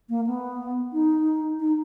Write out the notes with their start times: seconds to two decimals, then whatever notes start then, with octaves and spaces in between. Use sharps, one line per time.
0.09 A#3
0.27 B3
0.93 D#4
1.60 D#4